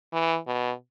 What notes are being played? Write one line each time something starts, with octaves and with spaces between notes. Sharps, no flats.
E3
B2